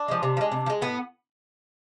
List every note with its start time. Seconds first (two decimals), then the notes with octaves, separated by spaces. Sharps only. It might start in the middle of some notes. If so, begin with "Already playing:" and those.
Already playing: D4
0.08 F3 G#3
0.23 C3
0.37 F3
0.41 G#3
0.52 C3
0.66 F3
0.70 G#3
0.82 A2 B3